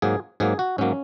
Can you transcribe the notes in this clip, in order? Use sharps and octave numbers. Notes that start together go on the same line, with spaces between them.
G#2 F#3 A#3 G#4
G#2 F#3 A#3 G#4
F#4
G#2 F#3 A#3 C#4